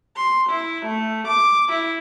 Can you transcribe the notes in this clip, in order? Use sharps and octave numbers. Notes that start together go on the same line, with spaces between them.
C6
E4
A3
D6
E4